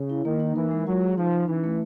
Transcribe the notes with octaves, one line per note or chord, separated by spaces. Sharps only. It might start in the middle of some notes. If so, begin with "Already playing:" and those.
Already playing: C#3
E4
D#3 A#3
D#4
E3 A#4
G#3
F#3 F4
G#4
F3 D#4
D#4
E3 C#4
A3